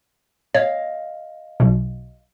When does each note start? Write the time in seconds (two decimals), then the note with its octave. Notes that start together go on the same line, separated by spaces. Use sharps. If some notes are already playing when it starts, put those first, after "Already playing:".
0.55 C#5 D#5 F5
1.60 B1 B2